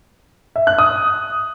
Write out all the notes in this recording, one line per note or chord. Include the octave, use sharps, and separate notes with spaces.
E5
F#6
D#6